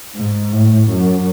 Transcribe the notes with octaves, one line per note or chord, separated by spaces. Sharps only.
G#2
A2
F#2